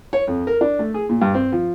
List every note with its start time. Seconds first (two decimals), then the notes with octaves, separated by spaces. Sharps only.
0.13 C#5
0.27 F2
0.47 A#4
0.61 D4
0.79 A3
0.94 G#4
1.09 A#2
1.21 G2
1.34 C4
1.52 F3